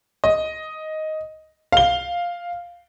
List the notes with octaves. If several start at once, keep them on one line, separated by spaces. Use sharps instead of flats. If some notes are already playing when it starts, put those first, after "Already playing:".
D#5
F5 G7